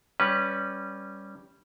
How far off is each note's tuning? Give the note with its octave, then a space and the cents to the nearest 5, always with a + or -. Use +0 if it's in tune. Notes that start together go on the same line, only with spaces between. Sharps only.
G3 +0 C#4 -10 B4 -10